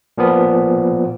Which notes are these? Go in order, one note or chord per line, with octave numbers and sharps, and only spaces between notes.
A#2 F3 B3